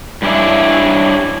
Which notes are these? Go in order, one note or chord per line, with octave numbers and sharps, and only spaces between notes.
G2 G3 C#4 D4 E4